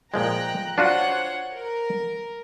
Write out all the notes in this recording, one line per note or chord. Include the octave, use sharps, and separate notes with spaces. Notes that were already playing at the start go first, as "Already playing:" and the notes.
A#2 F3 G#3 G5 A#5 F#6
D4 F4 F#4 C5 C#5 F#5
A#4